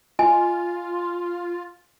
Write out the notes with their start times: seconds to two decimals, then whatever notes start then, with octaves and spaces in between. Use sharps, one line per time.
0.19 F4 D#5 G#5